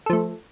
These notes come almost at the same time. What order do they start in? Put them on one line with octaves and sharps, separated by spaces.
A4 F3 A3